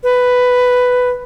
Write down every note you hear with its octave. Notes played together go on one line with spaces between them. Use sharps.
B4